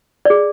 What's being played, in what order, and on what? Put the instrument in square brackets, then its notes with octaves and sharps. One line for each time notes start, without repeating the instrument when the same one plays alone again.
[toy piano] G#4 D5